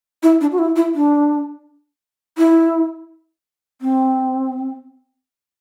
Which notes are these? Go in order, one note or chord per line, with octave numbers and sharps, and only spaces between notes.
E4
D4
F#4
E4
E4
D4
E4
C4